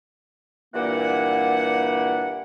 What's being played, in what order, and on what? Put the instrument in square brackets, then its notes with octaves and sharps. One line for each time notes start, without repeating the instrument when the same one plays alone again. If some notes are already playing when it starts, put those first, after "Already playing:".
[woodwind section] G2 A#2 E3 A#3 F#5